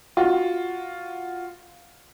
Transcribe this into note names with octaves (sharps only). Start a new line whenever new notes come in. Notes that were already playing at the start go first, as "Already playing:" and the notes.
F4 F#4